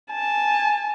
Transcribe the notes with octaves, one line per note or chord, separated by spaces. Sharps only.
G#5 A5